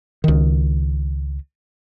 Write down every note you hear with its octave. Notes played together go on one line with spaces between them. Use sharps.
C#2 D#3